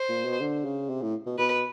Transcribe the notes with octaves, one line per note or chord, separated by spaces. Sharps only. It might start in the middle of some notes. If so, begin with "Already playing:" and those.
Already playing: C5
A#2
B2
D3
C#3
C3
A2
B2
B2 B4